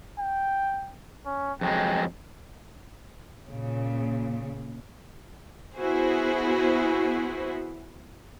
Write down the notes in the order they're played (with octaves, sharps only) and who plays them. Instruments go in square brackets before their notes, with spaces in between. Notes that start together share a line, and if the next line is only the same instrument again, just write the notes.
[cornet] G5
C#4
[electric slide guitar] F2 F#3 G#3 [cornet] G5
[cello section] A#2 C#3
[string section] B3 E4 F#4 G#4 C5